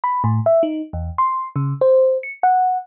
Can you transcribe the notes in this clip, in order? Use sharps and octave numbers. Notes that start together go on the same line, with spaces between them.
B5
A2
E5
D#4
E2
C6
C#3
C5
C#7
F#5